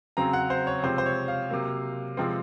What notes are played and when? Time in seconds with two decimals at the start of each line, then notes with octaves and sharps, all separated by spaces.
0.17 C#3 F#3 C4 A#5
0.33 F#5
0.50 C5
0.67 C#5
0.83 C3 F3 G#3 C4 C5
0.98 C5
1.06 C#5
1.28 F5
1.50 C3 F#3 A#3
2.17 C3 F3 G#3 C4